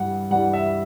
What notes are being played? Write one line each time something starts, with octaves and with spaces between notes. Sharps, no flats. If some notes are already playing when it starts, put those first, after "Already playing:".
Already playing: G2 E3 G3 F#5
G2 E3 G3 F#5
E5